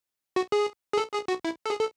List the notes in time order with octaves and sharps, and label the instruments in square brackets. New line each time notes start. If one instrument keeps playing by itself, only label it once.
[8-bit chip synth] F#4
G#4
G#4
A4
G#4
F#4
E4
A4
G#4
A4